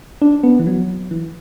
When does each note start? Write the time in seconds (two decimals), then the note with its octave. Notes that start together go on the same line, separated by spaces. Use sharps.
0.22 D4
0.43 B3
0.59 E3
0.67 F#3
1.11 E3